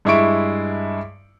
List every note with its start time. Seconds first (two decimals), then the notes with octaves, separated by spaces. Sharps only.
0.05 G2 G#3 E4 E5 C#6 D7